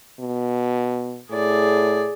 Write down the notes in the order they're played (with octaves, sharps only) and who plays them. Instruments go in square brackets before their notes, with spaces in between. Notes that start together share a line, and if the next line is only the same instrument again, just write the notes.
[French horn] B2
[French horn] A2 [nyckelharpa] G#4 D5